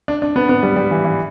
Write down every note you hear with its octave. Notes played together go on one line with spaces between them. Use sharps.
D4
D4
B3
B3
G3
G3
E3
E3